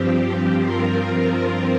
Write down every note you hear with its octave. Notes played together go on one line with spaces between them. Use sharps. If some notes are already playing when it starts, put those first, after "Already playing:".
Already playing: G2 F3 C4 G4
G2 F3 C4 F4 A#4